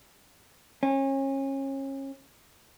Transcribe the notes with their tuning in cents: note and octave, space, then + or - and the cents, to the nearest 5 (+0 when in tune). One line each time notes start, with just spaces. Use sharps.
C#4 -30